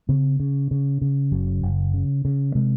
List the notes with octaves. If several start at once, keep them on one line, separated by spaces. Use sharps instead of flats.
C#3 C4
C#3
C#3
C#3
F#1 F#3
F#1
C#3
C#3
C3 G#3